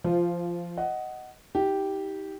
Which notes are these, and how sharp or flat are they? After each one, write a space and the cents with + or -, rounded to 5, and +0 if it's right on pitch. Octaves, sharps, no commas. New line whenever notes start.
F3 -15 F4 +0 C5 +0
D#5 +0 F#5 +10
D#4 +35 G4 -5